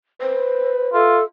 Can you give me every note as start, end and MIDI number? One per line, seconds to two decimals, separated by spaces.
0.21 1.23 71
0.21 0.92 72
0.94 1.20 65
0.94 1.24 69
0.94 1.21 76